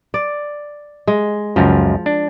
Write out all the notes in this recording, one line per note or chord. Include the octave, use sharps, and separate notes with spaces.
D5
G#3
C#2 F#2 F3
D4